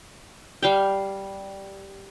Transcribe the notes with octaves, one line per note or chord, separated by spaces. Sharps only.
G3 F5 G5